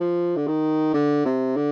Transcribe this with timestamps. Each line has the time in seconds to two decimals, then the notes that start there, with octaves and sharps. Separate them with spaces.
0.01 F3
0.36 D3
0.47 D#3
0.94 D3
1.25 C3
1.57 D3